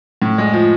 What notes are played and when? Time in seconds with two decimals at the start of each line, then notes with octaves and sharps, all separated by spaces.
0.22 A2
0.38 G#3
0.53 F3